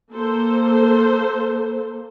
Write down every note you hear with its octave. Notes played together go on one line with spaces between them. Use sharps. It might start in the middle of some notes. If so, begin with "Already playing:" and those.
A#3 A4 C5